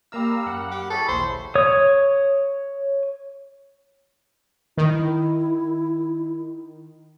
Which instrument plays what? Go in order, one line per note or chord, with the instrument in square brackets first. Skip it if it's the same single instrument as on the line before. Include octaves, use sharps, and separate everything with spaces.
[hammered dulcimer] G3 A#4 F5 [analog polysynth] A#3 A#5 E6
[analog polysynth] F#2 F#5
[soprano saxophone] G4
[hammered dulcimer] E4 C#5 [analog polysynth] G#4 B5 [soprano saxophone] A4
[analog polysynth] A#1 D#2 [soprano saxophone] C5
[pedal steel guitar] C#5 D#6
[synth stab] D#3 [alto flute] E4